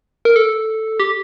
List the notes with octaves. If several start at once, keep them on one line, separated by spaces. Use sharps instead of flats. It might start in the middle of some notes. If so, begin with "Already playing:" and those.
A#4
A4
G4